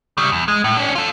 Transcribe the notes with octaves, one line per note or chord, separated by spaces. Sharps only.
C#3 G3
E2
G#3
A2
C#4 D4
F4 A4